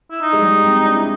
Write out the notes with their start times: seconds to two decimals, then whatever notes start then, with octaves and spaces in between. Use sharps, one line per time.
0.11 E4
0.21 D#4
0.33 G#3
0.42 G3
0.64 C4
0.85 D4
0.95 E4